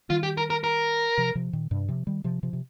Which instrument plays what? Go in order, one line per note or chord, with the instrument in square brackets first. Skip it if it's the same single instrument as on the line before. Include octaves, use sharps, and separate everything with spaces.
[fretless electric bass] D#3 G3 [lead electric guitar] F4
[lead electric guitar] G4
A#4
A#4
A#4
[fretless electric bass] C3 F3
C3 F3
A#2 D#3
G2 C3
C3 F3
D#3 G3
C3 F3
C3 F3
C3